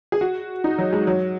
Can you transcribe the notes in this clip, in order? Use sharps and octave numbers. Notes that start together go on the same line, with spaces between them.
G#4
F#4
D#4
F#3
G#3
F#3